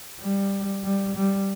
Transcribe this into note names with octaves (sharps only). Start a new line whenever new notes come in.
G3
G3
G3